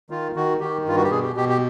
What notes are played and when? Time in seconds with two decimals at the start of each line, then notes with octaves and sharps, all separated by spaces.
0.10 D#3 F4
0.35 D#3 F#4
0.60 D#3 G4
0.86 G2 F4
0.96 F#4
1.04 G4
1.11 B2 G#4
1.23 G4
1.36 B2 G4
1.49 G4